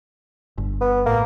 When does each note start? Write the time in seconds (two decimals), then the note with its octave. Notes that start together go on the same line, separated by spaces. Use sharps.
0.58 G1
0.81 B3
1.06 A1 A2 A#3